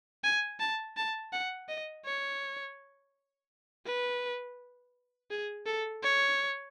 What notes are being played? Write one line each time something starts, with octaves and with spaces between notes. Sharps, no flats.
G#5
A5
A5
F#5
D#5
C#5
B4
G#4
A4
C#5